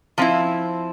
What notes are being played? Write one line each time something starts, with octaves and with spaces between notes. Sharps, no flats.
F3 C4 E4